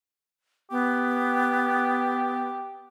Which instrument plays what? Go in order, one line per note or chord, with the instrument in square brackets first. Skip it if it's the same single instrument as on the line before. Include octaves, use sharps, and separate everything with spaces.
[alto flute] B3 [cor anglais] G4